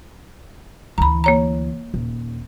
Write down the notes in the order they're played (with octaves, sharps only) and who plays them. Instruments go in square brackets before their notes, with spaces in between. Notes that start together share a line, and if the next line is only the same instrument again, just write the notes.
[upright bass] D2 E3 [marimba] A#5 B5
[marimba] A#3 C#5 A#5
[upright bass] D#1